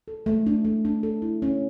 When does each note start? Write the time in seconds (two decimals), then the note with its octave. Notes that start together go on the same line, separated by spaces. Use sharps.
0.08 A4
0.26 A3
0.47 D4
0.65 A3
0.85 D4
1.03 A4
1.22 E4
1.42 C#4